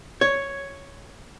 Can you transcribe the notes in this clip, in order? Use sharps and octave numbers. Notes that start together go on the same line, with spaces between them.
C#5